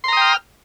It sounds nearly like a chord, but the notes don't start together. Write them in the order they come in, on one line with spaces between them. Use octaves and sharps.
C6 A#5 D#6 G5 F6